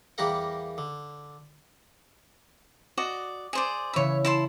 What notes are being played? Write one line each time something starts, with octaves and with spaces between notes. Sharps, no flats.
E2 G3 A#3 G4 A#4 F#5
D3
F#4 D5 D#5
G#4 C5 D5 E7
C#3 E3 C#5 B5 E6
E4 A5 C6